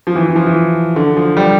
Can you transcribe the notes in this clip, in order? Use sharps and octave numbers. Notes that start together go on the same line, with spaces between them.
F3
E3
E3
F3
E3
D3
F3
G3